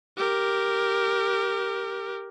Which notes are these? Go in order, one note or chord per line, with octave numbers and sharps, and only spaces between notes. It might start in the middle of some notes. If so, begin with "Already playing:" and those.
G4 A#4